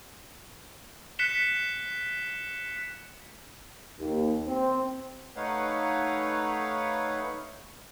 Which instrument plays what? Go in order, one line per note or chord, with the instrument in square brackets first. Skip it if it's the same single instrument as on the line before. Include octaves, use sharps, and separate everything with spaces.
[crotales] F#6 B6 C#7 E7 G7
[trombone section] D#2
C4
[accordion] A3 D#4 B4 C#5 F5 F#5